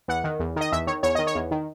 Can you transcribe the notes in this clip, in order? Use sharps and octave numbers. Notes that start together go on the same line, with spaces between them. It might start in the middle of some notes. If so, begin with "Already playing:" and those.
E2 F#5
D#3
E2
D#3 D#5
E2 E5
D#3 C#5
E2 C#5
D#3 D#5
C#5
E2
D#3